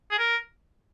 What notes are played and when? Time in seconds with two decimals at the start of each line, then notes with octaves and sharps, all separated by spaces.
0.11 G#4
0.19 A#4